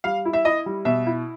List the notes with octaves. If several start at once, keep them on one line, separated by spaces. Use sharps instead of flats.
G3 F5
E4
E5
E4 D#5
G3
B2 E5
E4